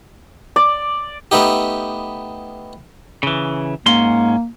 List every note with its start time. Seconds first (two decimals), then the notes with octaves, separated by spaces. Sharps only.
0.56 D5
1.31 A3 B3 D#4 G4
3.23 C#3 E3
3.86 G#2 A#3 C#4 C6